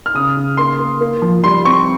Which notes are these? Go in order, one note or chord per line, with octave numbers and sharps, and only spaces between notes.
F6
C#3 D#6
C#3
A#3 C6
A#3
A#3
F3
G3 C6
C4 C#6